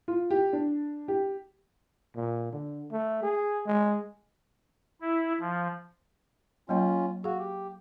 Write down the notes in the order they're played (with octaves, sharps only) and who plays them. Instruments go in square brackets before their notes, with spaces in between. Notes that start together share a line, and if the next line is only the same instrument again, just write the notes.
[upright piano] F4
G4
D4
G4
[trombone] A#2
D3
A3
G#4
G#3
[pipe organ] E4
F3
[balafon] F#3 A#3 D#5 [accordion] C#4 F4
[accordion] F#4 [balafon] G#4 F5
[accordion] G4